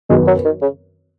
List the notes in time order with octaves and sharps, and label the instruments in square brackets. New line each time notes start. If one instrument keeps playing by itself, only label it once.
[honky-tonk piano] F#2 D#3 B3 F#4 B4 [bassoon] G#3
[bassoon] F#3
D#3
C#3